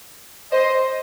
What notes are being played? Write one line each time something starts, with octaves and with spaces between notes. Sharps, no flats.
C5 D#5